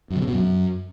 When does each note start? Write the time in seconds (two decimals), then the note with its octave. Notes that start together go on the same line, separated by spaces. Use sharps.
0.10 F#2
0.16 C#3
0.22 C3
0.27 B2
0.33 F#2